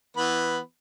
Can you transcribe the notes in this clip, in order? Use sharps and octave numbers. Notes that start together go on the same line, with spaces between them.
E3 B3 B5